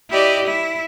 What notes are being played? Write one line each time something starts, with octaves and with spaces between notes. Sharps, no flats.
E4 G4 D5 D#5
E4